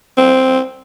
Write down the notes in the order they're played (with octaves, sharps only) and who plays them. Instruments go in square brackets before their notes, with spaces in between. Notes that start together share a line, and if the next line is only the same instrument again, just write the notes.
[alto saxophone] C4